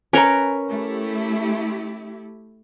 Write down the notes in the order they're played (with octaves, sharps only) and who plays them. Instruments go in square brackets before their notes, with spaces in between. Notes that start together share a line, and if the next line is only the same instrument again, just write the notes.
[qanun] C#4 A#4 B4 [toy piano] G#5 A#5
[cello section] A3 E4 G4